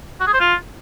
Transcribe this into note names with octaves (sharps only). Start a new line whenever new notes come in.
F#4
G#4
C5
F4